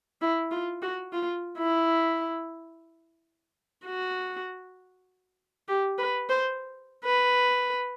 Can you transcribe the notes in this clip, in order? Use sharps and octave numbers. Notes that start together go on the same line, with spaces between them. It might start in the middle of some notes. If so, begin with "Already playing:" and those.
E4
F4
F#4
F4
E4
F#4
G4
B4
C5
B4